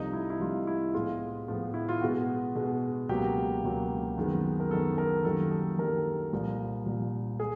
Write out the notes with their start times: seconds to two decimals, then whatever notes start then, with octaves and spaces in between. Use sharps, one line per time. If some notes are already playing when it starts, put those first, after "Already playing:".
Already playing: C2 C3 F3 A3 D#4
0.13 E4
0.30 E4
0.40 C2 C3 F3 A3 F4
0.67 E4
0.94 A2 F3 G#3 B3 F4
1.48 A2 F3 G#3 B3
1.74 E4
1.89 F4
2.02 B2 G#3 B3 F#4
2.55 B2 G#3 B3
3.09 C#2 B2 F#3 A#3 G4
3.63 C#2 B2 F#3 A#3
4.18 F#2 D#3 G#3 B3
4.60 A#4
4.70 F#2 D#3 G#3 B3 A4
4.98 A#4
5.24 F#2 D#3 G3 A#3 A4
5.51 A4
5.78 F#2 D#3 G3 A#3 A#4
6.33 C2 A#2 F3
6.86 C2 A#2 F3
7.40 G#4